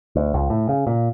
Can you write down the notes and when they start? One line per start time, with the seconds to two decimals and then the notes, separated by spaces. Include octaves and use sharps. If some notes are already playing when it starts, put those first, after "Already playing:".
0.16 D2
0.34 C#2
0.50 A2
0.69 C#3
0.87 A#2